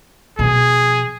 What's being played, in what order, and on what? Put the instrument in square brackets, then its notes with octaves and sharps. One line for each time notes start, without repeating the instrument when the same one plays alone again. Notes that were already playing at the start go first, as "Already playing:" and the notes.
[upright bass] B2 F3 [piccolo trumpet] G#4